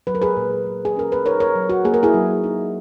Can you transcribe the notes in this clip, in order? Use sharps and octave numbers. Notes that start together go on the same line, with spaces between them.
F#3 B4
A#4
G#4 B4
A#2
A#3
G#4
C#4 A#4
B4
D#4 A#4 C#5
A#4 C#5
F#3
F#4
A#3 G#4
A#4
E4 G#4
F#3
D#4